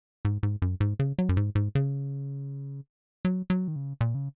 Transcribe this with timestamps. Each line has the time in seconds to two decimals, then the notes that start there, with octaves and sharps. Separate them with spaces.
0.25 G#2
0.43 G#2
0.62 F#2
0.80 G#2
0.99 C#3
1.19 F#3
1.29 F#2
1.37 G#2
1.55 G#2
1.75 C#3
3.25 F#3
3.50 F#3
3.68 D#3
3.76 C#3
4.01 A#2
4.15 C#3